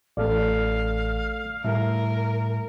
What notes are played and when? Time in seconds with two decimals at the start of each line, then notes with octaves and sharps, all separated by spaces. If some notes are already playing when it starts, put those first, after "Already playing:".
0.17 A1 A3 A4 D5 F5
1.64 A2 G3 A#4 E5